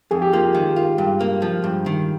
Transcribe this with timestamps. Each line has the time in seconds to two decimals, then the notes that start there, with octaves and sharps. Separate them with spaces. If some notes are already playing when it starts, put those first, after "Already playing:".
0.11 F2 G#4
0.22 G4
0.33 A#3 F4
0.44 G4
0.55 D#3
0.76 F4
0.98 G2
1.21 A#3
1.42 F3
1.64 G2
1.86 D#3